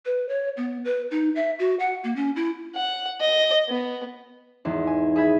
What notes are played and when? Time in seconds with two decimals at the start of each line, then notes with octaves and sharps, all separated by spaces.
0.06 B4
0.29 C#5
0.57 B3
0.85 B4
1.11 D#4
1.36 E5
1.59 F#4
1.79 F#5
2.04 A#3
2.16 C#4
2.36 E4
2.76 F#5
3.20 D#5
3.69 B3
4.65 G#1 E2 D#3 D#4 C6
4.87 G#5
5.16 G#4 E5 B5 G#6